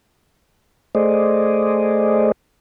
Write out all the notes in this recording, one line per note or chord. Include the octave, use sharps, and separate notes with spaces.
A3 G#4 C5 D5 D#5